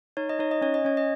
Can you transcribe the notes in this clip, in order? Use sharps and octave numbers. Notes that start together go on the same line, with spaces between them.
D#4 C#5
D#5
D#4 C#5
D#5
C#4 C#5
D#5
C#4 C#5
D#5